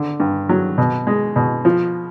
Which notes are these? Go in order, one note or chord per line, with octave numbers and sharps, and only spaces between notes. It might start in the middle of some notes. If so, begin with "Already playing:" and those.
Already playing: D3
G2
F#3
B2
G#3
B2
F3